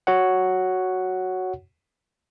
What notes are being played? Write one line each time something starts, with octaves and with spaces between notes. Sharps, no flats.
F#4 C#5 F#5